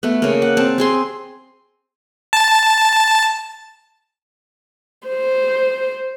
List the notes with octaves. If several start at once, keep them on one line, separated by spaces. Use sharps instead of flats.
A3 B3
C#3 A#3
F#5
C4 A5
C4 G#4 C6
A5
C5